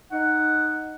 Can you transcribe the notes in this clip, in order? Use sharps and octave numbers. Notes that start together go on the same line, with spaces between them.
D#4 F#5